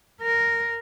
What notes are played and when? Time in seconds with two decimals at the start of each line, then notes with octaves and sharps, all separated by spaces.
0.22 A#4